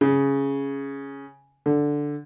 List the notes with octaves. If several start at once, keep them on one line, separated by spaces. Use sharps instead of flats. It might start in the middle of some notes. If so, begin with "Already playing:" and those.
C#3
D3